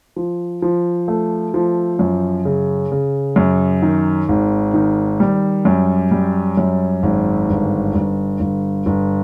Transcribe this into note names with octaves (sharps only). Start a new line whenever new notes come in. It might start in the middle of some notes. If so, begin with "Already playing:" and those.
F3
F3
A3
F3
F#2
C#3
C#3
F#2
D#3
G#1
D#3
G3
F#2
G3
F#2
G#1
G1
G1
G1
G1